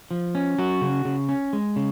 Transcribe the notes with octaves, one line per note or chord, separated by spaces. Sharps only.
F3
C#4
F#3 F#4
C#3
C#3
C#4
G#3
C#3